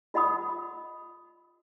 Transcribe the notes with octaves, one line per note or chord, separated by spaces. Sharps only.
F4 D#5 F#5 B5 D#6